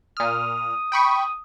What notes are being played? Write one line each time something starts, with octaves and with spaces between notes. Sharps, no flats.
A#2 D#6 F6
G5 B5 C#6